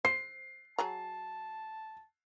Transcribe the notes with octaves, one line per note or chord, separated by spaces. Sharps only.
C5 C7
F#3 G#4 A5 A#5